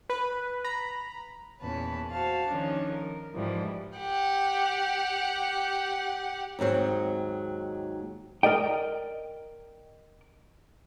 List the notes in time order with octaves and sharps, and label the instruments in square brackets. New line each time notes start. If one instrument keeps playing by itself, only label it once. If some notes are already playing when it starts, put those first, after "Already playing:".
[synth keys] B4
A#5 B5
[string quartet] E2 A#2 C#4 B4 A5
F#4 C5 F5 A5
D#3 F3 C#4 D4
A#4
G#2 E3 F3 G3
[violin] G4 F#5
[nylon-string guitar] D#2 G#2 F#3 C4
[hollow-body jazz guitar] A#4 D5 D#5 G5